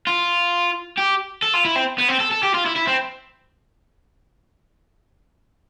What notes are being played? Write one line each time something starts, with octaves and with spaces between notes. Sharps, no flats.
F4
G4
A4
F4
E4
C4
B3
C4
A4
A4
G4
F4
E4
E4
C4